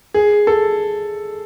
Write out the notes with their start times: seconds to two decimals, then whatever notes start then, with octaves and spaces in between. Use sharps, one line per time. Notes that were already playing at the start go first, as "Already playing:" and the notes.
0.14 G#4
0.47 A4